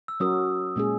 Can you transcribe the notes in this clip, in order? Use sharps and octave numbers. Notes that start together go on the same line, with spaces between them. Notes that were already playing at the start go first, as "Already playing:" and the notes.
E6
F#3 C#4 F#4 A#4 D#6
A#2 G#3 C#4 G#4